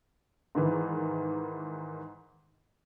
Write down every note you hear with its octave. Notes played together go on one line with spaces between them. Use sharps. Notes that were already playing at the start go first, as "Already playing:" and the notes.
G#2 D#3 E3